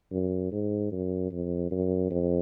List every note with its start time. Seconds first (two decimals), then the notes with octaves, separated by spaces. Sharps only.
0.11 F#2
0.52 G#2
0.92 F#2
1.31 F2
1.71 F#2
2.10 F2